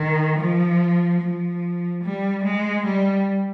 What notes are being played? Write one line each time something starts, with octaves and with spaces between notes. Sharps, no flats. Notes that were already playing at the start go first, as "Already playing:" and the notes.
Already playing: D#3
F3
F3
G3
G#3
G3